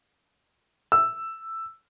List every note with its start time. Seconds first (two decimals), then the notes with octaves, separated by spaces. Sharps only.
0.92 E6